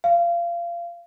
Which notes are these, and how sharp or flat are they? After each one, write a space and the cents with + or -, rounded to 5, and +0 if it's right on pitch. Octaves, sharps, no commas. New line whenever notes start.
F5 -25